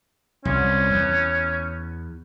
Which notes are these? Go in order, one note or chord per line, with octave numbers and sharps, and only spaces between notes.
C2 C#4
E2